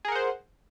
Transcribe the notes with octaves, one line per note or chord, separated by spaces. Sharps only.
G#4 A#4 C5 F#5